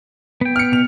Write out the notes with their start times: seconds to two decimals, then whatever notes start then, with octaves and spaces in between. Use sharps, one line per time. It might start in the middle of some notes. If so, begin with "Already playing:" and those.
0.41 B3 G5
0.56 F6 C#7
0.72 B2 F7